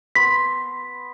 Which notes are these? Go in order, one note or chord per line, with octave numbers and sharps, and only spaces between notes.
B3 C6 B6